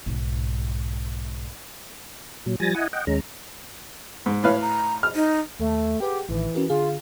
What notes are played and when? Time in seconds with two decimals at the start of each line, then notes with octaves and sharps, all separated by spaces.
0.06 B1 G#2
2.46 A#2 F#3
2.60 F3 G3 G#5 A6 A#6
2.75 E4 D#5 F#5 G#5
2.93 D#5 F#5 G5
3.07 D#2 G#3 C#4 A#5
4.26 G#2
4.44 A2 B4 C#5 F5
4.62 A#5
5.03 F6
5.15 D#4
5.60 D#2 A3
6.00 G4 G#4 B4 F#5
6.29 A1 A2 D#3 E3
6.55 C#4 F#4 A#4
6.70 D3 F4 G#4